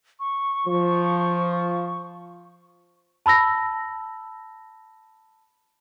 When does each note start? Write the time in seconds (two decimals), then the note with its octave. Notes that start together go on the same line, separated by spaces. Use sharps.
0.20 C#6
0.67 F3
3.26 A5 B5 E6 A#6